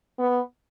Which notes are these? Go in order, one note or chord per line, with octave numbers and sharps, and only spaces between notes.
B3